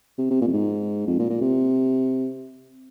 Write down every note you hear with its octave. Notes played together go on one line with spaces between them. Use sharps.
C3
C3
A#2
F2
G#2
F2
A#2
A#2
C3